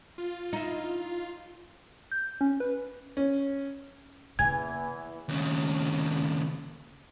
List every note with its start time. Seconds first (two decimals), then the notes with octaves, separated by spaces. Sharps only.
0.18 F4
0.53 D#4 E4
2.12 G6
2.41 C#4
2.60 B4
3.17 C#4
4.39 E2 C#3 E3 A#3 G#5 G#6
5.29 D#2 C#3